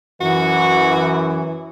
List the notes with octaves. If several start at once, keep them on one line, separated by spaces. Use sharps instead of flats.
F#2 E3 F#4